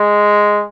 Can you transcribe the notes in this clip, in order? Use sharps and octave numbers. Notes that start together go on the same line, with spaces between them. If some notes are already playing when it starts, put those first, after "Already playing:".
Already playing: G#3